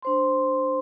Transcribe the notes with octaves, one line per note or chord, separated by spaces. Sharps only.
D4 C5 C6